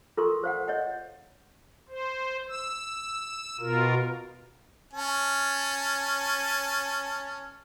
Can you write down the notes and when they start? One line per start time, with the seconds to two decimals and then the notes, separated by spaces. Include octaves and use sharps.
0.17 F4 A4 A#4 C6 C#6
0.43 C5 F5 F#5
0.68 C#5 D#5 F#5
1.89 C5
2.49 E6
3.60 B2 F4 A#4
4.93 C#4 A5